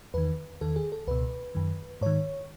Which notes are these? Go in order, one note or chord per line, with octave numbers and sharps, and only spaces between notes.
E2 D#3 B4
E2 D#3 A4
G#4
A4
C#2 B2 B4
F#2 D#3
G#2 D#3 C#5